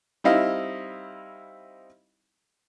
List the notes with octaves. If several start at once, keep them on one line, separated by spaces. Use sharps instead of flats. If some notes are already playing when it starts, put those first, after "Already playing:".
G3 C4 D#4 E4 D#5 F5